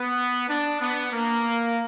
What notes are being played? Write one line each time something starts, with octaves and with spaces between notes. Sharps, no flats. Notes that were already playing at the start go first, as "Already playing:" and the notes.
Already playing: B3
D4
B3
A#3